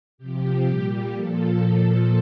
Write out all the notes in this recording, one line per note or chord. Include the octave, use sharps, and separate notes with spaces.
C3 F3 G4
A#2 G3 G4
A#2 F3 A4
A#2 F3 A4